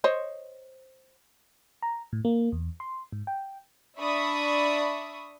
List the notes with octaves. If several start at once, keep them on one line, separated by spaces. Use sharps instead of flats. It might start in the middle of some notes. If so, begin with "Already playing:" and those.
C5 C#5 D#5
A#5
A2
A#3
E2
C6
G#2
G5
D4 D5 E5 B5 C#6 D#6